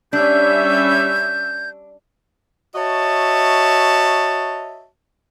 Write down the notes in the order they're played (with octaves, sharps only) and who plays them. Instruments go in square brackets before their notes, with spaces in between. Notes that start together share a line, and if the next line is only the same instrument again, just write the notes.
[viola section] G3 C#4 E5 [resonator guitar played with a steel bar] D4 [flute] G6
[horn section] F#4 C#5 D#5 E5 A5